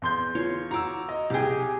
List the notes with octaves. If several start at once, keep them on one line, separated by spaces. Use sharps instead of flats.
E2 C6 G6
F4 C#5
F#4 A#5 D6 E6
D#5
C2 G4 G#4 G5